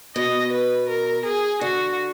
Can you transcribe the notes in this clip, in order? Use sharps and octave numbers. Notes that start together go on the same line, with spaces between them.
B2 D#5
B4
A#4
G#4
D3 F#4